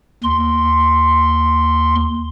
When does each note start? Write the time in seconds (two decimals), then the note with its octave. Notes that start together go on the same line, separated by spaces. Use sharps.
0.24 D#2 C6